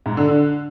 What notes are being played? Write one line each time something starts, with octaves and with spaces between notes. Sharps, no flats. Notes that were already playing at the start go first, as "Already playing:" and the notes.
G#2
D3
D3